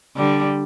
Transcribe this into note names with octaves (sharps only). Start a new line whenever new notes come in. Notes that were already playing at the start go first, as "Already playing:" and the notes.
D3 G3